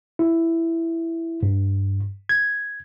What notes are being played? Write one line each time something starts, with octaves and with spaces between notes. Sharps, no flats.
E4
G2
G#6